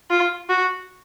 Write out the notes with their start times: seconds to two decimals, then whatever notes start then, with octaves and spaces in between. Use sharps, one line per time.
0.10 F4
0.49 F#4